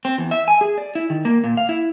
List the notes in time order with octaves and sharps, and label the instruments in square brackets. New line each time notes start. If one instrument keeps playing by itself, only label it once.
[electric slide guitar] C4
E2
E5
G#5
G#4
D5
E4
D#3
A#3
A#2
F5
E4